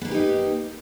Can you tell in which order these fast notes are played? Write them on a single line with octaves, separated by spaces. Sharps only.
B3 A#3 B4 G4 D#4